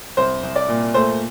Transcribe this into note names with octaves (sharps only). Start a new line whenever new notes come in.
C2 C5
C2
D5
A#2
A3 C5